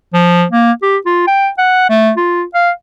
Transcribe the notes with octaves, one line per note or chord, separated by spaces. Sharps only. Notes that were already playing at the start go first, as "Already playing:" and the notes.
F3
A#3
G4
F4
G5
F#5
A3
F4
F5